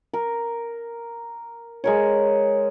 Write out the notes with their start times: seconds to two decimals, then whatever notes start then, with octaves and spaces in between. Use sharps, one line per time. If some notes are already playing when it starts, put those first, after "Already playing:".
0.13 A#4
1.84 G#3 A#4 C#5